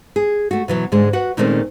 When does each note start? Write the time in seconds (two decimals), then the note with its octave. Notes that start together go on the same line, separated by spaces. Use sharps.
0.16 G#4
0.51 A3 F#4
0.68 B2 E3 F#3
0.92 G#2 D3 G#3
1.13 F#4 B4 F#5
1.37 A#2 D#3 G#3 A3 C4 C#4